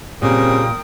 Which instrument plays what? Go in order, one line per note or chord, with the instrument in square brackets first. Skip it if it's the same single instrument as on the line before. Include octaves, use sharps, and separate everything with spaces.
[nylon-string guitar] A#2 [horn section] C#3 G3 [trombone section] C4 [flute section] A#4 G5 D#6